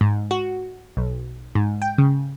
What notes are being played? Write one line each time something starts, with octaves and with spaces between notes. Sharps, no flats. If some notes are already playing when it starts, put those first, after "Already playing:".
G#2
F#4
B1
G#2
G5
C#3